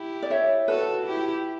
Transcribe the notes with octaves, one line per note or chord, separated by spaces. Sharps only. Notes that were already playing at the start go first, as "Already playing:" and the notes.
Already playing: E4 G4
D5
C#5 E5
F#4 A4 B4
E4 G4